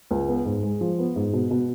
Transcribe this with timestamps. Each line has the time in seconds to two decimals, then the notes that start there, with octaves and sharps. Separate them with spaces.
0.11 C#2
0.28 B3
0.45 G#2
0.63 G#3
0.81 F3
0.99 B3
1.16 G#2
1.33 B2
1.51 B2